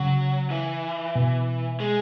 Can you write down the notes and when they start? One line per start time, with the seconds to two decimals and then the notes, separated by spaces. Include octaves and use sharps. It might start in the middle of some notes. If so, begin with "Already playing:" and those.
Already playing: C#3 F#3
0.50 E3
1.15 B2
1.80 G#3